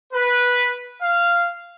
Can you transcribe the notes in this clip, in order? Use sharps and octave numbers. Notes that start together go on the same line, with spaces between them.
B4
F5